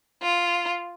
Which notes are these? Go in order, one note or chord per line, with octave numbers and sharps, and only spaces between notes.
F4